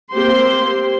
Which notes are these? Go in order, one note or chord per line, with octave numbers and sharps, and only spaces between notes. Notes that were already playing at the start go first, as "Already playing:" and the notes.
A#3 C4 G4 C5 C6